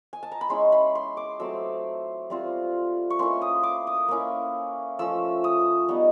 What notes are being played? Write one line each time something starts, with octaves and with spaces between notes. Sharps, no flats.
G#5
A5
A#5
B5
G#3 C#4 E4 C6
B5
C6
D6
F#3 A3 C4 E6
G3 C4 F4
C#6
A#3 C#4 E4 C6
D#6
D6
D#6
A#3 C#4 E4
F3 A3 C#4 E6
D#6
G3 B3 D#4